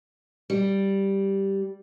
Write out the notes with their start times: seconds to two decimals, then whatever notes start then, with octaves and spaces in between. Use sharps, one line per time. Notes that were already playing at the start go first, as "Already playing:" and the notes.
0.50 G3